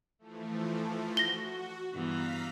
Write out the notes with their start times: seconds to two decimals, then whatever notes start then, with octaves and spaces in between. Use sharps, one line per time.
0.19 E3 F3 A3
1.17 F#4 A#6 G7
1.94 G2 E3 B3 F5 A#5 B6